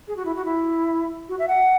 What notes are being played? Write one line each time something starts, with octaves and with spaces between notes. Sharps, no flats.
G#4
F#4
E4
F#4
E4
F#4
E5
F#5